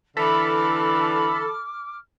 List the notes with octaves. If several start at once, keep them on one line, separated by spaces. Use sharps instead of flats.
D3 E3 A4 B5 D6 F6